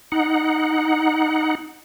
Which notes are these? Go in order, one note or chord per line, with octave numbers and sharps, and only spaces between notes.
D#4 F#5